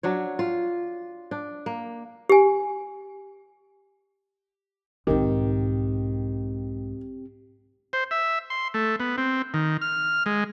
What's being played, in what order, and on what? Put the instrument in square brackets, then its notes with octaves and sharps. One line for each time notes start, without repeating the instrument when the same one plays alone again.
[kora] F#3 D4 C#5
F4
D4
A#3
[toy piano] G4 G#5
[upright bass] B1 G#2 [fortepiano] D#3 [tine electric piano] C4 G4
[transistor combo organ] C5
E5
C6
A3
B3
C4
D#3
F6
G#3